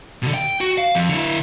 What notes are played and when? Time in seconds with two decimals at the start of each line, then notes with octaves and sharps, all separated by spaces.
0.22 B2 D3
0.34 G5
0.61 F#4
0.78 F5
0.95 F2
1.09 D3 E4